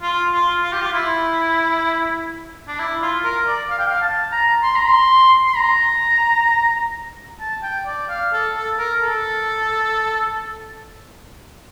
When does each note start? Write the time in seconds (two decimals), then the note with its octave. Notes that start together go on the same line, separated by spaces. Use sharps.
0.01 F4
0.33 F4
0.62 F4
0.72 G4
0.82 F4
0.94 E4
2.68 D4
2.79 E4
3.02 F4
3.24 A#4
3.47 D5
3.70 F5
3.78 G5
3.86 F5
4.02 A5
4.31 A#5
4.63 C6
4.75 A#5
4.88 C6
5.47 C6
5.56 A#5
7.40 A5
7.62 G5
7.86 D5
8.09 F5
8.32 A4
8.55 A4
8.78 A#4
9.02 A4